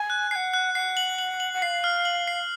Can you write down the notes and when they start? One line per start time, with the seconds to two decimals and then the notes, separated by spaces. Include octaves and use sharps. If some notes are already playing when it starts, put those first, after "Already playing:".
Already playing: G#5
0.10 F#6
0.31 G#5 C7
0.36 F#5
0.54 F#6
0.75 F#5 C7
0.97 F#7
1.19 F#7
1.40 F#7
1.54 F#5
1.62 F5 C7
1.84 F6
2.05 F#7
2.28 C7